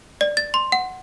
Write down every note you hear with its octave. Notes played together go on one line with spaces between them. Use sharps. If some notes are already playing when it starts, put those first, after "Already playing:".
D5
A6
C6
F#5